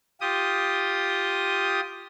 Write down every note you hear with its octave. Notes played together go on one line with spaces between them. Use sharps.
F4 G4 D#6